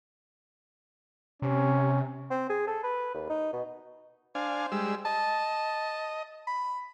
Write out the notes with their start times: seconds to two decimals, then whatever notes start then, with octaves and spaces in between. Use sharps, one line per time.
1.42 C3 C#4
2.31 C4
2.49 G#4
2.67 A4
2.84 B4
3.14 D#2
3.29 D#4
3.53 B2
4.35 D4 C5 F5 G#5
4.72 G3 G#3 E6
5.05 D#5 A5
6.47 B5